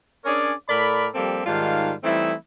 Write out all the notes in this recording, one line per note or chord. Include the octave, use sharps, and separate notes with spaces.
C#4 D4 G#4 A#4 C#5 D5
A2 A4 A#4 D5 B5
F3 G3 A#3 C4 G4 A4
G#2 D#3 G3 F4 F5 A5
E3 G3 A3 C4 D#4 E4